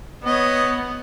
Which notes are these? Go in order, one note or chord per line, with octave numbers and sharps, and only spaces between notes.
B3 C#5 D#5